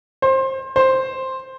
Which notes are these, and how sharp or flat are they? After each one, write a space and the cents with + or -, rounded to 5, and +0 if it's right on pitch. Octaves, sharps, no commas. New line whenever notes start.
C5 +25
C5 +5